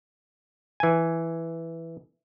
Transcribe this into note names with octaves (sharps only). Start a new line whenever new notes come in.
E3 G#5